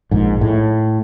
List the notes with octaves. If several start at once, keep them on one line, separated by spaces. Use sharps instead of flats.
A#1 G#2
A2